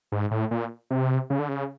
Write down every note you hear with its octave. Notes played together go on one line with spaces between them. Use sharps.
G#2
A2
A#2
C3
C#3
D3
C#3